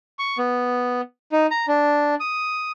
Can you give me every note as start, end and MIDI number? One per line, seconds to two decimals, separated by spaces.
0.19 0.38 85
0.38 1.01 59
1.32 1.47 63
1.51 1.66 82
1.68 2.15 62
2.20 2.71 87